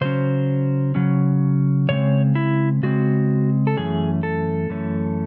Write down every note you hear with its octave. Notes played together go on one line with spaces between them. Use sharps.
C#3 F#3 C#4 C5
C#3 F#3 C#4
C#3 G#3 C4 C#5
E4
C#3 G#3 C4 F#4
A4
F#2 E3 A3 C#4 G#4
A4
F#2 E3 A3 C#4